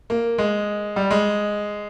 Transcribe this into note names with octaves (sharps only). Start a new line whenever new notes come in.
A#3
G#3
G3
G#3